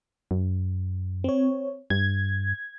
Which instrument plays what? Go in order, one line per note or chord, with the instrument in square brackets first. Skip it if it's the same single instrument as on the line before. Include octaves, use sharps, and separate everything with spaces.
[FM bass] F#2
[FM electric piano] C4 C#5
[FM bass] G2 [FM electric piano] G#6